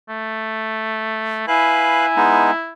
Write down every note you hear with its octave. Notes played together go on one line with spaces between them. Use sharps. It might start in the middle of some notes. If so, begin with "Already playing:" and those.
A3
E4 B4 F5 G#5 F#6
G#3 B3 D#4